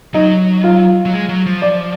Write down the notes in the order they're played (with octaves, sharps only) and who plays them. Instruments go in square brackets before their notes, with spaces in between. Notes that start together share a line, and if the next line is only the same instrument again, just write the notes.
[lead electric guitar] F#3 [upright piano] D#4
[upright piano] F4
[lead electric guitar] F#3
G#3
F#3
F3
[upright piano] D5